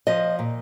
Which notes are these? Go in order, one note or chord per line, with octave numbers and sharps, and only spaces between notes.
F3 D#5
A#2